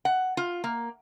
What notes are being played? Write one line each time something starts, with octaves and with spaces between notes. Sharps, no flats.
F#5
F4
A#3